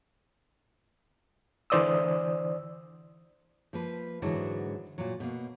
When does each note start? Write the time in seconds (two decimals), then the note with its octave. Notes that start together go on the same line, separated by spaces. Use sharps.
1.70 D3 E3 C5 D5 D#6 E6
3.73 F3 A#3 B4
4.22 G#2 D3 E3 F#3 G#3 F#4
4.98 A#2 F#3
5.20 B2 A#3